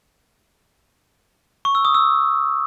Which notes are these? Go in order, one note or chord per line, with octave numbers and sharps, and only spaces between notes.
C#6
E6
D#6
E6